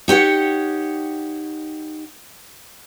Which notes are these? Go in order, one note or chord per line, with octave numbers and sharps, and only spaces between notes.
D#4 G4 C#5 F#5